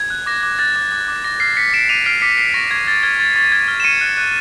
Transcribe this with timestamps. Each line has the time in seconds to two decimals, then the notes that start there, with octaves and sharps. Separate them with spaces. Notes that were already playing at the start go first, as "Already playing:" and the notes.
Already playing: G#6
0.10 F#6
0.26 D6 A#6
0.43 D6
0.59 F#6 A6
0.76 D6
0.92 D6
1.08 D6
1.24 D6 A#6
1.40 F6 C7
1.57 F6 B6 C#7
1.73 D6 D7 E7
1.89 D6 D#7 F7
2.05 F6 C7 D7
2.22 D6 B6 C#7
2.38 F6 C7
2.54 C#6 A#6
2.70 C#6 G#6
2.87 F6 A6
3.03 F6 G#6
3.20 C#6 A6
3.36 C#6 A6
3.52 F6 G#6
3.68 F6
3.80 E7
3.84 C#6 C#7 D#7
4.01 F#6
4.17 F#6